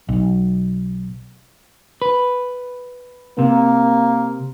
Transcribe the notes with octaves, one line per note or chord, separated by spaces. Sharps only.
B1
B4
C3 A#3